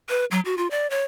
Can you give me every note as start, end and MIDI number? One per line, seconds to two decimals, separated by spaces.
0.09 0.25 71
0.31 0.40 54
0.45 0.57 66
0.57 0.68 65
0.71 0.89 74
0.90 1.04 73